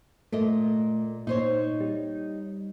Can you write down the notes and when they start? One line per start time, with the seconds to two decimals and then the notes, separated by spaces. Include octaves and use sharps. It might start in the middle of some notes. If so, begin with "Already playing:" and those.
0.33 A#2 A3 A#4 D#5
1.27 A#2 D#4 C5 C#5
1.81 G3